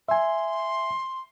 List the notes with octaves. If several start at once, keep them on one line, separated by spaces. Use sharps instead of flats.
E5 G#5 C6